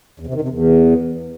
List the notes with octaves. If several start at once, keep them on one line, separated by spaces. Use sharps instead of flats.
E2
C3
D#3
C3
E2